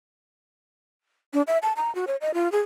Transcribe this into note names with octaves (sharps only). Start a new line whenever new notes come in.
D4
E5
A5
A#5
F#4
C#5
D#5
F4
G#4